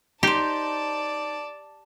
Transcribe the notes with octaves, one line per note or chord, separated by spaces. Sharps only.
D#4 G4 C5 D5 A5